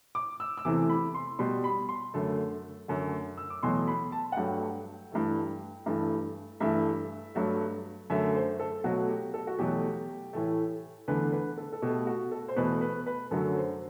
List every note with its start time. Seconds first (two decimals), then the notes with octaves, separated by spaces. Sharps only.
0.15 D6
0.40 E6
0.57 E6
0.65 E2 C3 E3 A3 D6
0.89 B5
1.15 C6
1.39 B2 G3 C6
1.64 B5
1.89 C6
2.14 F#2 D3 A3
2.88 F#2 D3 F#3 A3
3.38 E6
3.50 D6
3.63 E2 B2 F#3 A3 C6
3.88 B5
4.12 A5
4.32 F#5
4.37 G2 F#3 A3 G5
5.12 G2 E3 A3
5.86 G2 E3 A3
6.60 G2 E3 A3 E5
7.35 G2 F#3 A3
8.10 F#2 D3 A3 E5
8.35 C5
8.59 A4
8.84 B2 F#3 A3 F#4
9.09 G4
9.34 A4
9.47 F#4
9.58 E2 B2 F#3 A3 G4
10.33 A2 E3 A3
11.08 E2 D3 A3 B4
11.32 B4
11.58 A4
11.73 A4
11.82 B2 A3 G4
12.07 F#4
12.32 A4
12.48 C5
12.56 E2 B2 A3 B4
12.81 B4
13.06 B4
13.31 F#2 D3 F#3 A3 A4
13.56 C5